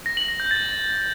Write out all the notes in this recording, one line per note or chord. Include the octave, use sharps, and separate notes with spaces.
A#6
F#7
A#6
G6
A6